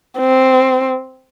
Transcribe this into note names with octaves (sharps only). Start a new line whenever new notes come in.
C4